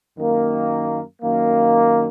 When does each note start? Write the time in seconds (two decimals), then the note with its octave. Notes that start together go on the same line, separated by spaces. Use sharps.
0.16 F#2 D#3 A#3
1.22 F#2 D#3 A#3